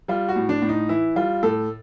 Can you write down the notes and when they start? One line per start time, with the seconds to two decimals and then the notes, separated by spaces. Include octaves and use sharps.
0.08 G3 F4
0.29 F#4
0.36 A2
0.49 D4
0.62 A2
0.69 D#4
0.89 E3 E4
1.16 G3 F4
1.43 A2 A4